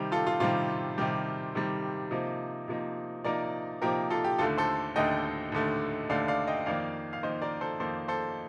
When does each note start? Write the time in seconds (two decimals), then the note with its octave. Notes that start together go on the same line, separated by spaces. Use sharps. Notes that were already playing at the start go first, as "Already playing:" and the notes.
Already playing: C3 D#3 G3
0.12 F4 A4
0.27 F4
0.40 C3 D#3 G3 F4
0.98 C3 D#3 G3 G4
1.55 C3 D#3 G3
2.11 C3 F3 A#3 D#4
2.68 C3 F3 A#3 D#4
3.24 C3 F3 A#3 D#4 A#4 D5
3.82 C3 F3 A#3 D#4 G4 A#4
4.10 F4 A4
4.25 G4
4.38 D#2 D3 A3 F4 A4
4.58 A4 C5
4.96 D#2 D3 A3 D#5 G5
5.52 D#2 D3 A3
6.09 D#2 D3 A3 D5 F5
6.28 D5 F5
6.47 D#5 G5
6.66 F2 D#3 A#3 D5 F5
7.13 F5
7.23 F2 D#3 A#3 C5 D#5
7.42 A#4 D5
7.61 A4 C5
7.80 F2 D#3 A#3 A4 C5
8.08 A4 C5